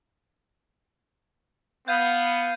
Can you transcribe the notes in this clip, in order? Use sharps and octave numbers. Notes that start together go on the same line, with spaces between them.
B3 F5 G6 G#6 D#7